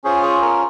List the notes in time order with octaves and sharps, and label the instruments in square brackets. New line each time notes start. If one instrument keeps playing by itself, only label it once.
[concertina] C#4 F4 G#4 C5
G#4
A#4